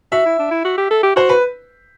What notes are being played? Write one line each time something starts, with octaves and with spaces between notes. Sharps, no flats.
F#4 E5
E4
D4
E4
F#4
G4
A4
G4
F#4 C5
B4